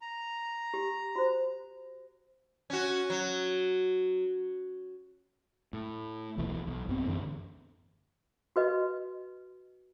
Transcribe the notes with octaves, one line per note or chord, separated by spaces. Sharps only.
A#5
G4
F#4 C5
C#4 F#4
F#3
A2
D#1 B1 B2 E3
B1
B1 G2 B3 C4
A1 F#2 D3 E3
F#4 B4 D#5